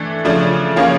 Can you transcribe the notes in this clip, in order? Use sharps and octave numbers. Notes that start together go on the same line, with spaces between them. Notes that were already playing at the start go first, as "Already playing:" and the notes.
Already playing: E3 A3 D4
C#3 F3 A3 D4
C#3 F3 A#3 C#4 F4